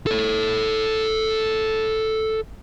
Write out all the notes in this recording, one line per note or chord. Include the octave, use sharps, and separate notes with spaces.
A4 C#5